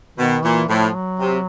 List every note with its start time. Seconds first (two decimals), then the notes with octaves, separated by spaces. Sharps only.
0.18 B2 D#3
0.43 A#2 E3
0.68 A2 F3
0.94 F#3
1.19 C3